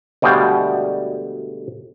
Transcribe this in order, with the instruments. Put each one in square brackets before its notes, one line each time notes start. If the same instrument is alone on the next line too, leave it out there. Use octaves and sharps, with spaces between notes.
[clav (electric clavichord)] D2 B2 G3 G#3 F5 G5